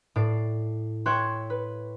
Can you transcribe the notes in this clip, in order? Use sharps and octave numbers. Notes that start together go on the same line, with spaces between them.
A2 D5 C7
C#5 E5 G5 C6 F#6
B4